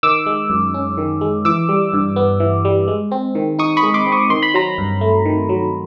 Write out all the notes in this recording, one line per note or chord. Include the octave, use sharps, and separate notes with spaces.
D#3 D6 E6
G#3
F#2
C#4
D#3
G#3
E3 D6 E6
G3
G2
B3
E3
G3
G#3
C4
D#3
D#4 C#6 D#6
B5 C#6
G#3
C6 D6
C4
C#6 D#6
D#3 C6
B5
F#3 A#5 C6
G2
A3
D#3
F#3